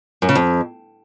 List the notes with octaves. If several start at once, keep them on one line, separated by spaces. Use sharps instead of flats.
F#2
C#3
F2